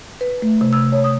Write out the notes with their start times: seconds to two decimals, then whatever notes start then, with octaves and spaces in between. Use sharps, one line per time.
0.21 B4
0.42 A3
0.61 C3
0.73 E6
0.92 C#5
1.04 D#6